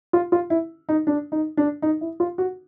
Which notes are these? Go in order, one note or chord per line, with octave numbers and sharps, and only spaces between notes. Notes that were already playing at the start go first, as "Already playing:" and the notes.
F4
F4
E4
D#4
D4
D#4
D4
D#4
E4
F4
F#4